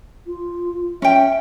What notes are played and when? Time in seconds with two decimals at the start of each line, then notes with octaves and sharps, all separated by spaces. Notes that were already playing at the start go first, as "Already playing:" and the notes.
0.27 F4
1.02 C#4 E5 G5